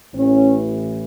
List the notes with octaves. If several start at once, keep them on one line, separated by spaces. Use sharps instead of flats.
A1 A2 E3 C#4